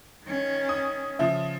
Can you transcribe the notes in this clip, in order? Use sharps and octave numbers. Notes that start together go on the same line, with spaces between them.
D#3 C#4
D#6
C#3 F3 E5